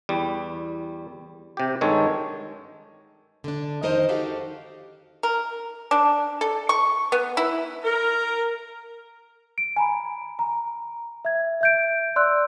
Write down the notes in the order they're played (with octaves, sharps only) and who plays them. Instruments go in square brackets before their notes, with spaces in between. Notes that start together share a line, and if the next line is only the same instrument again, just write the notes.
[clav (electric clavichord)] E2 G3
C3 G4
G2 D#3 G#3 A4 C#5
[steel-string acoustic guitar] D3 D4
F2 D#3 D#4 A#4 C5 D#5
D#4 F#4 G4 A4 F5
[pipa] A#4
D4
A4
C#6
B3
E4
[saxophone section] A#4
[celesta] D7
G#5 A#5 B5
A#5
E5 G#6
E5 G6 D7
D5 C6 E6 F#6